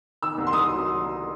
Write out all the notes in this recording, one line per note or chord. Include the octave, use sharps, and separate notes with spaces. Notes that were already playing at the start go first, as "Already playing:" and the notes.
D#3 E6
C2
C6
C2 D#6
F#3